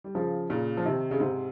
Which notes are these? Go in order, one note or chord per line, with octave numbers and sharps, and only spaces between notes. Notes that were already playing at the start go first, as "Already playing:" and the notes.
G3
C#3 F3
A#2 C#3
F3
C3 D#3
C#3
G#2 C3